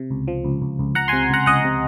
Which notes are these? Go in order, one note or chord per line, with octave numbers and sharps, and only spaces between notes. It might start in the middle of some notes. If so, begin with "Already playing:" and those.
Already playing: C3
C#2
F3
C#2
C#2
C#2
C#2 F#5 A#5
C3 G#5 C6
C#2 F#5 A#5
C#2 D#5 F#5
C3